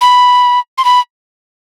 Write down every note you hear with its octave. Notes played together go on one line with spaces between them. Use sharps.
B5
C6
B5